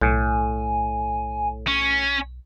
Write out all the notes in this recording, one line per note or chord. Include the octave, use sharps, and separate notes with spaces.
B1 A2 G#5
C#4